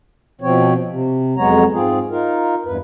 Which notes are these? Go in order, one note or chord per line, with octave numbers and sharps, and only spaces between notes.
B2 F3 C4 C#5
C3
F2 F#3 G#3 B3 C#5 A#5
G#2 C4 F4 G#4
D#4 F4 A#4
E2 G2 B4